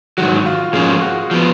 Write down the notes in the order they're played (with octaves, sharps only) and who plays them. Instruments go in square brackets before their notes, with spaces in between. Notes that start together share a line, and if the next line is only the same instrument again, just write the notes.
[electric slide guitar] G#2 D#3 F#3 [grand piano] F#4
[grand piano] F4
[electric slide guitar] G#2 F3 A#3 C#4 [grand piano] G#4
[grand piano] F#4
[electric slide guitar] F3 B3